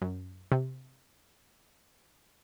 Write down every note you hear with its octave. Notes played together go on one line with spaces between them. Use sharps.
F#2
C3